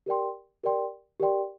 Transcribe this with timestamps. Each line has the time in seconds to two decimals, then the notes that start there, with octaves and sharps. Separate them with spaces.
0.06 G4 A#4 D5 G5 C6
0.63 G4 A#4 D5 G5 C6
1.20 G4 A#4 D5 G5 C6